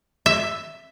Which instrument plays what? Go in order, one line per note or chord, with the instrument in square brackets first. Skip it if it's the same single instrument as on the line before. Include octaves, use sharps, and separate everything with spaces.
[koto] E5